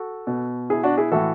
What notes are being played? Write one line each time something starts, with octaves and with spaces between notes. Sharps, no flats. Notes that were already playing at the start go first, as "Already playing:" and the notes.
Already playing: F#4 A4
B2
E4 G#4
D4 F#4
E4 G#4
A2 E3 F#4 A4